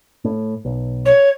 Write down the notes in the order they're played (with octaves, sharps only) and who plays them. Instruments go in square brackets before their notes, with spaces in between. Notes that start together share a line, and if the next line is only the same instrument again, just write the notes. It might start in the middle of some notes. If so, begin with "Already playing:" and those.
[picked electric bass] A2
B1
[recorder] C#5